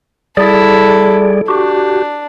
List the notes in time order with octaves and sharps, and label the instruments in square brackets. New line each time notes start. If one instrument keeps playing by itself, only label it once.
[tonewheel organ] G3 G#4 D5 [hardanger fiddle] E4 A4
[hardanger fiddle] D4 [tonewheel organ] F#4 G4